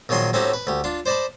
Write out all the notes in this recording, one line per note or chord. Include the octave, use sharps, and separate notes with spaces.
A#1 D#3 F#3 G#5 C6 D#6
A2 C4 C#4 D#4 F#4 G4
B4
D2 G4
D4 F4
C5 D5 D#5 A5 B5